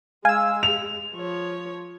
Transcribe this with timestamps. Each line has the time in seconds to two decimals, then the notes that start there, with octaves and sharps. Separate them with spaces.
0.25 G#3 F5 G#5 E6
0.63 F7
1.15 F3 C#5